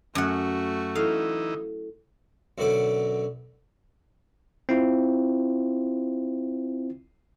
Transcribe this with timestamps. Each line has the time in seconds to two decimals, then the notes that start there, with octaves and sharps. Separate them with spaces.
0.15 F#2 A3 F#4 F#5
0.95 E3 D#4 E4 A4 F5
2.58 F#2 B2 D3 D6
4.69 C4 E4 F4